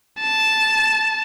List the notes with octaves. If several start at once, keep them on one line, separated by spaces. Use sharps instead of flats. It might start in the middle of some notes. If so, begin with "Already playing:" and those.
A5